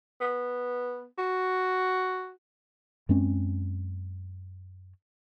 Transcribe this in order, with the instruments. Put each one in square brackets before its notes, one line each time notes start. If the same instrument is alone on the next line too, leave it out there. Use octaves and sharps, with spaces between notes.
[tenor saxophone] B3
F#4
[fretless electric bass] F#2 G#3 C4 C#4